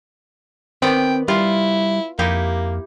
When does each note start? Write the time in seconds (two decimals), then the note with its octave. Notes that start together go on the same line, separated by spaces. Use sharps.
0.82 D#3 B3 C4 D5 G5
1.28 G3 E4 F4
2.19 F2 A#3 D#4 E4 G4